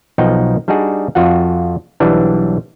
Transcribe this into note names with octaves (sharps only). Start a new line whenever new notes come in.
B1 B2 F3 D#4 F#5 G5
G3 D4 D#4 F#4 G#4
F2 F4 F#4 F#5
B1 E3 F#3 G3 D4